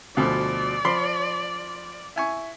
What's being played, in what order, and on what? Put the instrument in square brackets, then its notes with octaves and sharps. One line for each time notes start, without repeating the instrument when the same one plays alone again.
[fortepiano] D2 B2 F3 [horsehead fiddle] D5
[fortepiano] F3 B5 C6
E4 G#5 C#6